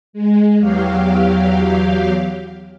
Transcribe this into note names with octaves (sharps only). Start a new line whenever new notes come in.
G#3
E2 F#3 G4 F5